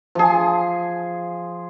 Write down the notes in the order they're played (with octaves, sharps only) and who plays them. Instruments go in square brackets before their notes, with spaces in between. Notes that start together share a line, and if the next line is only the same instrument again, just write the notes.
[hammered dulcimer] F3 G#4